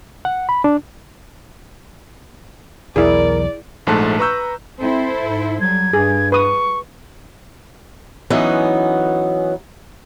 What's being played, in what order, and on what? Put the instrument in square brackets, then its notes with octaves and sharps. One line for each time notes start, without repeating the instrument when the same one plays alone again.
[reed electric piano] F#5
B5
D4
[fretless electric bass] B1 E2 [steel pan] E4 G#4 [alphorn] A#4 [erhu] D5
[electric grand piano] A#1 G#2 A3 A5 F#6
B4 A#5 C#6 E6 G6
[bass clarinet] C4 [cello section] E4 A4 C5
[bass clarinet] G#2
[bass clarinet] F#3 [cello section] G3 [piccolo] G#6
[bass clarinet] G2 [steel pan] G#4
[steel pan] B4 D#6 [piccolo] C#6
[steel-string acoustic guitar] E3 F#3 B3 C#4 D#4